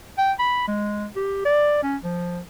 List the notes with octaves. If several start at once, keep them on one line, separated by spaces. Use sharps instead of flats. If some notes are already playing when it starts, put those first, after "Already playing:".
G5
B5
G#3
G4
D5
C#4
F3